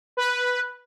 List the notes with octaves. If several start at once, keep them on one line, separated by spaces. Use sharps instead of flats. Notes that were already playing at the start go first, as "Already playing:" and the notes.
B4